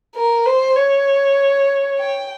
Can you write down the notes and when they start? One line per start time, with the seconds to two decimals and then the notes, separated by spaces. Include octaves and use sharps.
0.15 A#4
0.46 C5
0.76 C#5
1.99 G5